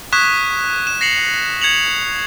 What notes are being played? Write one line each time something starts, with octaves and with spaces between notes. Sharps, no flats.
C#6 D#6 F#6 G#6 B6 E7
E7
A#6 C7 C#7 F7 F#7
G#6 C#7 F7 F#7